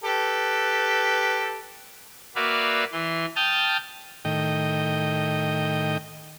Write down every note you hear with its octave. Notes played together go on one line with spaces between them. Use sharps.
G4 A4 B4
A#3 F#4 B4 D5 E5 F5
E3 C6
G5 A5 D#6 F6 G6 A6
A2 D#3 D#5 G5